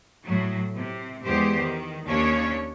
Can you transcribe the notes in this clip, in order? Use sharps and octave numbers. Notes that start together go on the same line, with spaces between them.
A2 F#3
C3
E2 G#3 G4 C5
D#3
D#2 C#4 D4 C#5